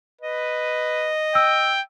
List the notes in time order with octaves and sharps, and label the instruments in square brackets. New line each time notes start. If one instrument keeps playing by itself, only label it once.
[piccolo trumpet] B4 [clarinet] D#5
[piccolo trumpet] G5 [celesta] E6